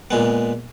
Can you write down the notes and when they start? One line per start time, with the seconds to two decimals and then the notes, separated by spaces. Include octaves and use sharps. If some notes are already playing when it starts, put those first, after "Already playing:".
0.11 A#2 G#3 B3